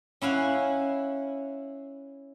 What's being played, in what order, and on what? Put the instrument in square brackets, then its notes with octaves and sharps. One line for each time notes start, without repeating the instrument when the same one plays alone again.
[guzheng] C#4 E4 F5 F#5